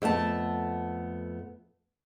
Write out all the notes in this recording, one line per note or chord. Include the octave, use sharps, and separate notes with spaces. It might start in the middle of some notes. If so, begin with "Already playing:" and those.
F2 A3 B3 A5